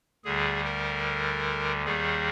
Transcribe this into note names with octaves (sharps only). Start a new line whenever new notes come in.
D2 D3 G3 G#4
A#4
D#2 D#3 G3 G#4